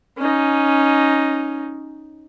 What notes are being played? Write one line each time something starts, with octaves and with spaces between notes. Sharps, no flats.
C#4 D#4